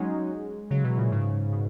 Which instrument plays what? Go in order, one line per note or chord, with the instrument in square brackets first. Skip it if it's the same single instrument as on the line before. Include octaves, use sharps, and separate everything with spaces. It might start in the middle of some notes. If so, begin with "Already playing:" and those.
Already playing: [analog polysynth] F#3 G#3 C#4 D#4 F#4
[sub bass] C#3 [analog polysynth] F#3
[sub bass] B2 [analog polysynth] E3
[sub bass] A#2 [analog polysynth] C#3
[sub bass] G#2 [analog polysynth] C#3
[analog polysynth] B2